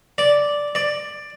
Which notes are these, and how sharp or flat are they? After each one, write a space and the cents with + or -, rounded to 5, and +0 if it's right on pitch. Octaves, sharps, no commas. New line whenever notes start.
D5 -5
D5 +10